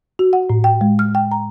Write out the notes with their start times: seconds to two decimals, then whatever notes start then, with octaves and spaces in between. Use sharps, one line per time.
0.19 F#4
0.33 F#5
0.50 A2
0.64 G5
0.81 G#3
0.99 F6
1.15 G5
1.31 A#5